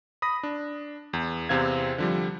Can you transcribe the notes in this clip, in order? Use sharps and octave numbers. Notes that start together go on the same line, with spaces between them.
B5 D#6 A#6
D4
E2
E2 C3 C4 F5 G#6
D3 F3 G3